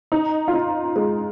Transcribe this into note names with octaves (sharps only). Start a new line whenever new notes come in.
D#4
F4
D#4
G#3